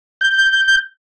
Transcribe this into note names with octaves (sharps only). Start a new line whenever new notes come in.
G6